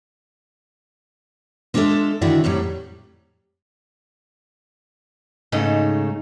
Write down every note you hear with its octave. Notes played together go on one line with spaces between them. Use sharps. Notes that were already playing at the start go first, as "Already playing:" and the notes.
G#3 D4 F4 F#4 A4 E5
D3 D#3 E4 F#4 D5
F2 A2 F#3 G3
G#2 C#3 A3 D#4